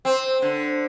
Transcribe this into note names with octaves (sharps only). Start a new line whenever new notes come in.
C4
D3